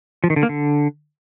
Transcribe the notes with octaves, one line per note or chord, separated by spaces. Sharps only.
F3
D#3
D3
A#3
D3